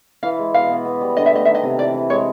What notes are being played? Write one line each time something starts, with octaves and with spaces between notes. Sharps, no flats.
E3 F5
G#3
B2 F5
B3
B3
G3
D3 D#5
E5
A3 D#5
D#3 E5
D#5
C3
E3 D5
E3
G#3 C#5